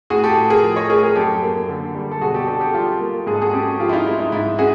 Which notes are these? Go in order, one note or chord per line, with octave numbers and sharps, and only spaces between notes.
A2 F#4 G#4
G4 A4
A2
G#4 A#4
F3
C#5 D#5
A3 G#4 A#4
G#4 A#4
F#2 G4 A4
A#3
D3
G3
A4
B2 F#4 G#4
G4 A4
D4 G4 A4
G4 A4
G3 F4 G4
A#3
G#2 G#4
A4
F#4 G#4
C#4 G4 A4
F3 F4 G4
E4
D#4 F4
G#3 E4
D#4
G#2 E4
C#4 F#4 G#4